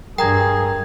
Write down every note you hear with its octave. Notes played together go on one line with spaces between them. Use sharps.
G2 G#4 A#4 G5 A#5 G#6